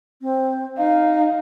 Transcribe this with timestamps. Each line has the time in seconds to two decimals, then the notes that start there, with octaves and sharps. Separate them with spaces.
0.22 C4
0.78 D#4 F5